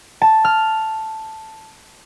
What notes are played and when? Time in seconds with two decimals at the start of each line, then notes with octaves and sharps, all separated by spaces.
0.22 A5
0.45 F6